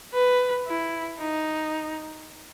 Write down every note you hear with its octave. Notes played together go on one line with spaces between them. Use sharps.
B4
E4
D#4